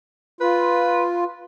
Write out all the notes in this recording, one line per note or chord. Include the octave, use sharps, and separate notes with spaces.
F4 B4